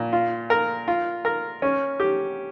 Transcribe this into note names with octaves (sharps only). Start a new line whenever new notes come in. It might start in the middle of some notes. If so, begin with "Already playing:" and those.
Already playing: A#2
F4
A#4
F4
A#4
C#4
G4